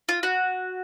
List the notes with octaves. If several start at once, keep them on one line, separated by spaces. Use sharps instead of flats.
F4
F#4